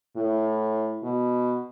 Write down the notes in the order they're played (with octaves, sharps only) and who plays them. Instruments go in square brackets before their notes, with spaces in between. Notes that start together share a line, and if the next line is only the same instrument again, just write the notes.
[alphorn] A2
B2